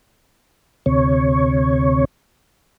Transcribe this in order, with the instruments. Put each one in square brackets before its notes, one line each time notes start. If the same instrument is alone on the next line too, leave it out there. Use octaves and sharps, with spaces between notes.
[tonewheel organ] D2 C3 C#5